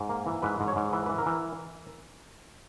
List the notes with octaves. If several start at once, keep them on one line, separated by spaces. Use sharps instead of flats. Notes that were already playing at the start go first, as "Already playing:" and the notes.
Already playing: G#2
A#3
E3
G#2 B4
G#2
C#5
G#2
E3 B4
E3 B4
A#4
E3